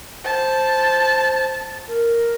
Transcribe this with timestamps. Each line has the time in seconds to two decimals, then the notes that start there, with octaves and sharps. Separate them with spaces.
0.25 C5 A5
1.88 A#4